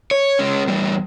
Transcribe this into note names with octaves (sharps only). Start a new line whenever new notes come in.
C#5
G#3 C#4
E2 G3